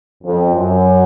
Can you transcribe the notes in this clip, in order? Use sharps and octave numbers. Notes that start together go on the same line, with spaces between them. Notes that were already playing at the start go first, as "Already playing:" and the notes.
F2
F#2